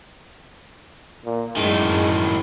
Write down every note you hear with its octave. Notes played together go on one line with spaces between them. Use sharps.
A#2
F#2 A2 D#3 G#3